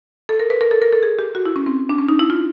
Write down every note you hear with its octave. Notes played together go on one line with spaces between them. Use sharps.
A4
A#4
B4
A#4
A4
A#4
A4
G#4
G4
F#4
E4
C#4
C4
D4
C#4
D#4
E4
F4